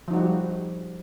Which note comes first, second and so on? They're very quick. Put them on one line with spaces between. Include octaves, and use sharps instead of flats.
F3 D#4 F#4 G3